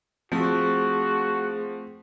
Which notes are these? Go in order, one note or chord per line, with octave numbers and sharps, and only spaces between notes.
F3 A3 C4 F#4 G#4